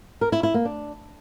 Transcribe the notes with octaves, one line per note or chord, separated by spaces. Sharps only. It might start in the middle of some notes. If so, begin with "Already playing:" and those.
A#4
E4
E4
A#3
D4